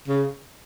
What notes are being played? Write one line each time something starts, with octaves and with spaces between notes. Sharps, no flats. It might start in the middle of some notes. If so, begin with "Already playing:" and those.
C#3